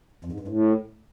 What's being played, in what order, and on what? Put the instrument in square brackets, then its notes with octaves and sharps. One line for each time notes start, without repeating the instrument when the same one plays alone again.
[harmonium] F2
G#2
G2
A2